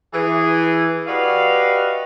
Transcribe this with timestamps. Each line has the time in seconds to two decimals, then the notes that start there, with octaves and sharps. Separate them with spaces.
0.13 E3 G#4
1.07 F#4 G4 B4 D5 D#5 F5